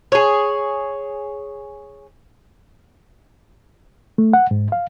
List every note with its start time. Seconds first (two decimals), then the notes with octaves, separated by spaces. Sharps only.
0.12 G#4 C#5
4.18 A3
4.33 F#5
4.51 G#2
4.72 F5